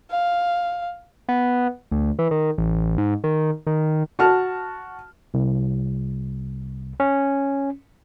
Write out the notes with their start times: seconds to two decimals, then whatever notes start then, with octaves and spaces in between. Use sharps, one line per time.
0.11 F5
1.29 B3
1.91 D2
2.19 E3
2.31 D#3
2.58 A1
2.98 G#2
3.24 D#3
3.67 D#3
4.19 F#4 A5 F6
5.34 C2
7.00 C#4